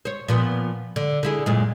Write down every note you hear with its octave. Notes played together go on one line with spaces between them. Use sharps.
C5 C#5
A#2 F3 B3
D3
D3 E4 G#4
F#2 A#2 G#3